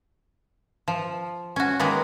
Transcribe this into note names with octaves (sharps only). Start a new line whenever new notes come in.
F3
C#4 F#4
D#3 G#3 A#3 B3